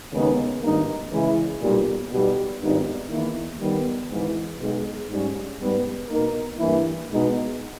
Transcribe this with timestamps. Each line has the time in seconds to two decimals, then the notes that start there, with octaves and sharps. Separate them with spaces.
0.11 D#2 C#3 G#3 B3 D#4
0.62 G#1 G2 D#3 A#3 D#4
1.11 C#3 E3 G#3 C#4 E4
1.61 B1 A#2 G3
2.10 B1 B2 G3
2.60 G#1 G2 G3 B3 D#4
3.10 E2 D#3 A#3 E4
3.60 D#3 G3 B3
4.10 G#1 G#2 E3
4.59 B1 B2 G#3
5.08 G#2 G3 C#4
5.59 G#2 G3 B3
6.09 B2 A#3 D#4 A#4
6.58 G2 E3 A#3 E4
7.08 B2 G#3 D#4